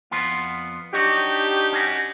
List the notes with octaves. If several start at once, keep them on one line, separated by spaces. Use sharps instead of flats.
F2 B3 F4
D4 D#4 F#4 G4 C#5
C#4 F#4